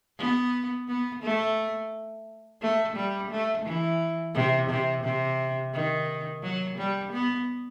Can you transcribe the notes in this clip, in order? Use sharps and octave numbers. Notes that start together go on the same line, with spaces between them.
B3
B3
A3
A3
G3
A3
E3
C3
C3
C3
D#3
F#3
G3
B3